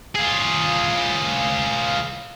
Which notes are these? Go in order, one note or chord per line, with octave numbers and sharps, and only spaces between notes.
F4 G#4